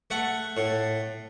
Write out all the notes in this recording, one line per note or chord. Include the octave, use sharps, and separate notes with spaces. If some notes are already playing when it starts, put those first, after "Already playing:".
A3 F#5
A2